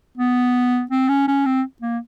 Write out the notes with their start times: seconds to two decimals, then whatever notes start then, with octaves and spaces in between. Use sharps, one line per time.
0.17 B3
0.91 C4
1.09 C#4
1.27 C#4
1.45 C4
1.82 A#3